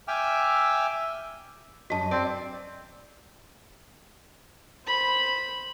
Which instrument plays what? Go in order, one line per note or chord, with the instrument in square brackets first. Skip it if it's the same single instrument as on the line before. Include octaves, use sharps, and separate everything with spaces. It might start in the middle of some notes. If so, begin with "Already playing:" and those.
[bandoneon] E5 G5 G#5 D6 E6 F6
[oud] F#2 D#5 [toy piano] F#4 A5
[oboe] C4 [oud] D5
[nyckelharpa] C5 B5